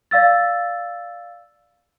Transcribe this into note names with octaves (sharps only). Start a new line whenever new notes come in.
D5 F5 E6 A6